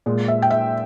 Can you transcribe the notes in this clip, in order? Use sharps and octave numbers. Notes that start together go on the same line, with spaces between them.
A#2 G#3
E5
G5
E5